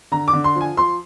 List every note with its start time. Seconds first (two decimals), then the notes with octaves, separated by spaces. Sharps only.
0.12 D3 A#5
0.28 D6
0.33 D3
0.44 C6
0.55 F3
0.61 G#5
0.77 F3 C6